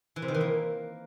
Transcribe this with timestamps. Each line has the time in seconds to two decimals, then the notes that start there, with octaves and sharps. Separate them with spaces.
0.16 E3
0.22 C3
0.28 D#3
0.34 E3
0.41 A#3